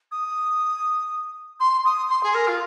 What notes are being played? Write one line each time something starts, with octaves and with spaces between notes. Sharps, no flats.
D#6
C6
D#6
C6
G#4
A#4
F4